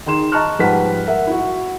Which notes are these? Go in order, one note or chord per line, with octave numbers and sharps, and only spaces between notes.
D#3 G#4 C6 E7
D#5 A5 A#5 C#6 F6 F#6
G#2 F3 G3 B4 F#5 B6
A#4 E5 F#5
E4 F#4